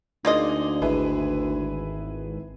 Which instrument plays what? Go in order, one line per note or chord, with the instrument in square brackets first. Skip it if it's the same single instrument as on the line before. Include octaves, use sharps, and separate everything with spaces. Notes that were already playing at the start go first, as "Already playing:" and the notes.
[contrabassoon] D2 [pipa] A#3 F4 D#5 [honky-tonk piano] D#4 G#4 D5
[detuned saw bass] G#1 [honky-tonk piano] E4 G#4 B4